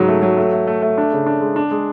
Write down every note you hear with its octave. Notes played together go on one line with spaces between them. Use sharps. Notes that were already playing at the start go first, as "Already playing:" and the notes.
Already playing: G#2 C#3 F#3
A3
F#3
A3
A3
A3
A3
D4
C#3
D4
G#3
D4
G#3